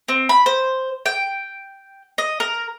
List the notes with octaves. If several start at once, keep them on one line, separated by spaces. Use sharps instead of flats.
C4
B5
C5
G5
D#5
A#4